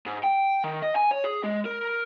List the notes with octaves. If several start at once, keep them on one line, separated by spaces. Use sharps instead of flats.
G#2
G5
D#3
D#5
G#5
C#5
G#4
G#3
A#4